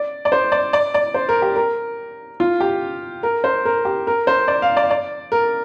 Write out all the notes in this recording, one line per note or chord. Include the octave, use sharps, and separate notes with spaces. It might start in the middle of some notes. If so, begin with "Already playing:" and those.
Already playing: D5
D5
C5
D5
D5
D5
C5
A#4
G4
A#4
F4
G4
A#4
C5
A#4
G4
A#4
C5
D5
F5
D5
D5
A#4